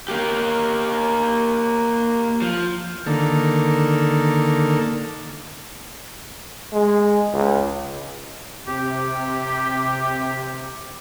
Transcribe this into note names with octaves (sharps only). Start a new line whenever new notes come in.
A#3 G4
F3
D3 D#3 A#3 A4
G#3
C#2
C3 G4